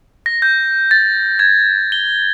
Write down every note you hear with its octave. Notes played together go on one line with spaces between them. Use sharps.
A#6
G6
A6
G#6
G7